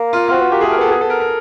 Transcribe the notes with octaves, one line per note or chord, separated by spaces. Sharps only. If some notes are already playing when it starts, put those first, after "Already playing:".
Already playing: A#3
F4
C4 F4 F#4
B3
A#3 G4
G#4
A3
A#4
B3 A4
G#4
A4
A#4
A#4